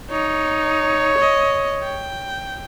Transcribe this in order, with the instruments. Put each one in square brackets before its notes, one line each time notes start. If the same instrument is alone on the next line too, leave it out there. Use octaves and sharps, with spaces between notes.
[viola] D#4 [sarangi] C#5
[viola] D#5
G5